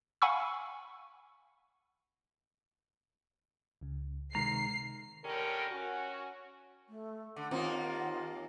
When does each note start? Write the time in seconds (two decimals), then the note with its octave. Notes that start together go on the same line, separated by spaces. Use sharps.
0.22 F5 F#5 G#5 B5 C#6 E6
3.81 C#2 C#3
4.35 C3 D#3 G#3 A#5 C7
5.25 A2 D3 C#4 G4 A#4
5.72 C#4 F#4
6.89 A3
7.36 D3 F#5
7.51 D#2 A#3 C4 D#4 F4